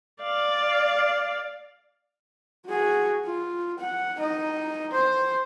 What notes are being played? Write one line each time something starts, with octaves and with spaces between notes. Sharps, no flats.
D5 F5
F#4 G#4
F4
F#5
D#4 D#5
C5